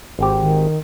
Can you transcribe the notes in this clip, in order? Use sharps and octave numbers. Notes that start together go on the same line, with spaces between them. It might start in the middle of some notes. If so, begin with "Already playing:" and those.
G#1 C4 G4 C5
D#3